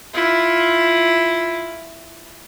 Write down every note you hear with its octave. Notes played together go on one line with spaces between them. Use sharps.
E4 F4